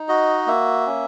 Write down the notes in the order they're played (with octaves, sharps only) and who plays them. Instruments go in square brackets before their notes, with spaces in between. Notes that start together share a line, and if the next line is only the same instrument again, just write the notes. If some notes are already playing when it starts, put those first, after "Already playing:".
Already playing: [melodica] D#4
F#4 D#5
A#3 E5
C#4